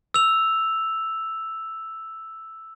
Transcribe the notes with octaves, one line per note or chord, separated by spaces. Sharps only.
E6 F7